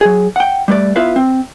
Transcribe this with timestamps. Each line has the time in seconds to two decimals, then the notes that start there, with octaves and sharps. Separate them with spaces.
0.01 F#3 G#4
0.36 F#5 G5
0.68 G3 A3 B4 D5
0.96 B3 E4 F4 B4 E5 F5
1.16 C4